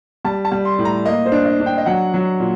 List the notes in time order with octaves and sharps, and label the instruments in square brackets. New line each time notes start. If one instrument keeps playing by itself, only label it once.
[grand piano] G3 A5
A5
G3
C6
A2
A#5
A#3 D#5
C5
D4
D#5
D4
G5
D#5
F#3 F#5
F#3
A#2